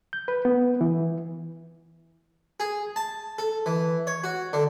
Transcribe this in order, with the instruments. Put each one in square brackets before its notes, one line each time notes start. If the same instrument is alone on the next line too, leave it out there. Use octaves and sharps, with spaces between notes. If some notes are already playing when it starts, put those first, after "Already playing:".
[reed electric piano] G6
B4
B3
E3
[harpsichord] G#4
A5
A4
E3
C#5
F#4
D3